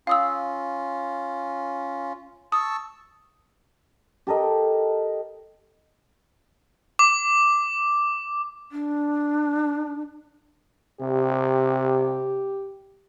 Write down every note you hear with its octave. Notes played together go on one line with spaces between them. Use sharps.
C#4 F4 F5 D#6 E6
A5 C#6 D#6 E6
G4 A4 A#4 D#5
D6
D4
C3 G4